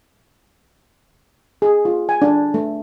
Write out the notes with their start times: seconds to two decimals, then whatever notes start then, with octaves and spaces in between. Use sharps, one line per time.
1.62 G#4
1.85 F4
2.09 G#5
2.22 D4
2.54 A3